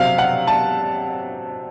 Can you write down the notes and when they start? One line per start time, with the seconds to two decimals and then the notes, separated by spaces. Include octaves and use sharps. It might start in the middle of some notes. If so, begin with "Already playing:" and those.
Already playing: C3 F#3 C4 F5
0.18 F#5
0.47 A5